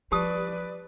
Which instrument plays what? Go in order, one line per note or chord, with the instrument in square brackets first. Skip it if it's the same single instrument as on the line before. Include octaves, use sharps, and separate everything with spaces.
[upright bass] F3 [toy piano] G4 A5 D#6 [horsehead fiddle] B4 D5